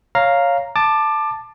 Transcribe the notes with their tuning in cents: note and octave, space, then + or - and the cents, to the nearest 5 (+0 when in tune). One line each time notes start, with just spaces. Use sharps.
C#5 +0 F5 +0 A#5 +0
A5 +0 D6 +20